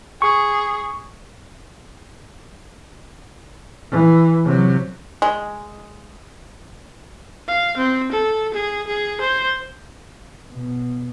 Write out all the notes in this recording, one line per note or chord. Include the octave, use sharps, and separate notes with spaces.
G#4 C#6
E3
C3 F#3
G#3
F5
C4
A4
G#4
G#4
C5
B2